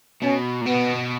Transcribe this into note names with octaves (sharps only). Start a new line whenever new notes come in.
B2 C#4
A#2
B2 B3